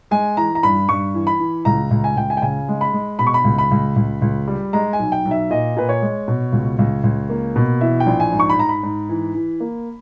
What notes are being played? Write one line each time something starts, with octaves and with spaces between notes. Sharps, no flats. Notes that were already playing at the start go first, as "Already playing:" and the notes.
G#3 G#5
E3 A#5
A#5
G2 B5
G2 C#6
E3
B5
E3
C#2 A#5
C#2
G#5
C#2 G5
G#5
G5
C#3 G#5
G#3
B5
G#3
B2 B5
C#6
B5
C#2
B5
C#2
C#2
C#2
G3
G#3 A#5
G#5
B1
G5
B1
E5
A#2 D#5
A#2 B4
C#5
G#3
B2
C#2
C#2
C#2
A#3
B2
E3 E5
G5
A#1
G#5
G#2
C#6
B5
G#2 A#5
B5
G#2
E3
E3
A#3